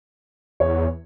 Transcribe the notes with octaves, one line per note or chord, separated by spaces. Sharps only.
E2 C#5